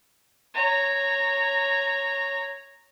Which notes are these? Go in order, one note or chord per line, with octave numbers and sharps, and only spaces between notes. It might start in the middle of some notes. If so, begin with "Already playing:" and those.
C#5 A#5